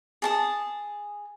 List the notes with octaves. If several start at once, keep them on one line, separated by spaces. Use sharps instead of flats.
G#4 A5 D#6